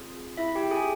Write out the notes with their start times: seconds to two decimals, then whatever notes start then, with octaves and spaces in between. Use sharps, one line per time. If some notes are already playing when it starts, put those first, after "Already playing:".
Already playing: C4 F4 G#4
0.37 E4 E5
0.55 G4 G5
0.71 G#4 G#5